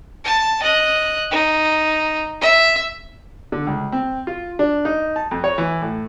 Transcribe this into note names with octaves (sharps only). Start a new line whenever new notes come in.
A5
D#5 F#6
D#4
E5
D3
C#2
C4
F4
D4
D#4
A5
F2
C#5
E3
A2